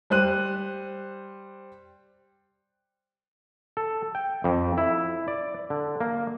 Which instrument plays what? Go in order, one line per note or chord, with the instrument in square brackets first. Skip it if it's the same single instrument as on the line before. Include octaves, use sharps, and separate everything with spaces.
[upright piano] G3 C5 F#6 D#7
[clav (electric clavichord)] A4
G5
F2
E4
D5
D3
A#3